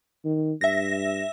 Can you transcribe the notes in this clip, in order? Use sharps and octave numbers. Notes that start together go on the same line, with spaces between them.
D#3
G2 E5 A#6